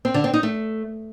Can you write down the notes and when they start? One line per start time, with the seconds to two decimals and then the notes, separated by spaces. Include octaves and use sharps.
0.05 C4
0.14 D3
0.24 C4
0.34 D#4
0.43 A3